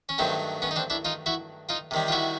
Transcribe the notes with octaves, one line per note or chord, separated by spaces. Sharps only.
C#4
G2 D#3 F#3 A3 C4
B3 C#4
D#4
C4 D4
D4 E4
D#4 F4
E4 F#4
D#4 F4
C3 D#3 G3
F4
E4 F#4